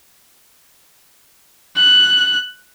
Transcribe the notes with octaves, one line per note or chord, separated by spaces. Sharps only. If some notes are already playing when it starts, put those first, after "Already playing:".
F#6